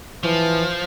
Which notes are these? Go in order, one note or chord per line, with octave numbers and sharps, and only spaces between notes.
E3 F3